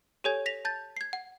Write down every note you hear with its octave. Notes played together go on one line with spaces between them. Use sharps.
G4 A4 C#5 G#5 G#6
A#6 B6 F7
A5 G6 A6
G#6 C7
F#5